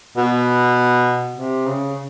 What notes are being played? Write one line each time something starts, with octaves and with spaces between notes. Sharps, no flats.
B2
C3
C#3